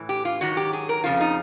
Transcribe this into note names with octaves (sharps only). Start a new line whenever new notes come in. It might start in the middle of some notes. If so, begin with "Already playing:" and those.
Already playing: A2 E3
G4
F4
G#2 D#3 F#3 F#4
G4
G#4
A#4
F2 C#3 F3 F4
D#4